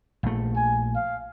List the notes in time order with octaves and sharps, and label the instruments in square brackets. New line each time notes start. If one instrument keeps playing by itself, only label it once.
[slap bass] A#1 A3
[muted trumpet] G#5
F5